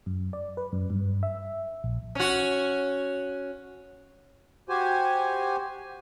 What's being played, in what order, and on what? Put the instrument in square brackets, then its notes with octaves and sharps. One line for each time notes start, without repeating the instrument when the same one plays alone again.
[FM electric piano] F#2
D5
B4
F#2
G2
E5
A#1
[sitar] C#4 F#4
[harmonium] F#4 G4 C5 G#5